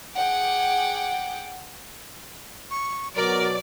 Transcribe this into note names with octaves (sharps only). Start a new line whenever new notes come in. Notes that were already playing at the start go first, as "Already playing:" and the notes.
G#4 F#5 G5 D6
C#6
B2 F#3 A#4 D5